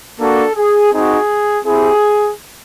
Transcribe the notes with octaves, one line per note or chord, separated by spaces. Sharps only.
A#3 D4 F#4 A4
G#4
C4 D#4 F#4 G#4
C4 E4 G4 G#4